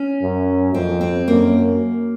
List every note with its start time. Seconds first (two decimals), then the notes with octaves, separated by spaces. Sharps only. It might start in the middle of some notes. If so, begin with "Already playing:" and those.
Already playing: C#4
0.22 F#2
0.74 F2 C4
1.01 C4
1.28 F#2 A#3